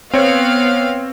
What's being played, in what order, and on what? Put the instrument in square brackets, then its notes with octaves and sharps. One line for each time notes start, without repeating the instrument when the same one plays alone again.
[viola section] B3 F5 [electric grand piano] C4 C#5